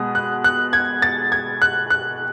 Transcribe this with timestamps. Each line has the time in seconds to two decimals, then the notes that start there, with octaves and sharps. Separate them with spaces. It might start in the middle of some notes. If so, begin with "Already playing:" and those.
Already playing: B2 G#3 B3 D#6
0.15 F#6
0.44 F#6
0.73 G#6
1.02 A6
1.32 G#6
1.62 F#6
1.90 F#6